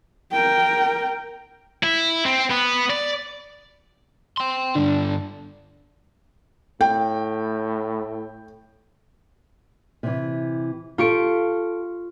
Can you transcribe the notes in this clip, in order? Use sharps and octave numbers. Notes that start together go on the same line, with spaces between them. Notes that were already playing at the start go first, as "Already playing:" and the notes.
A#4 G5
E4
C4
B3
D5
G5 C6
G2 D3 D4
A2 G5
C3 E3
F4 G4 A4 C#6 D7